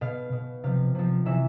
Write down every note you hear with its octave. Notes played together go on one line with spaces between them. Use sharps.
B2 F5
B2
C3 F3 F5
C3 F3
C3 E3 E5